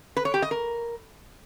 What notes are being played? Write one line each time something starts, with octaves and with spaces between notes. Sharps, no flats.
B4
C#5
G4
D#5
A#4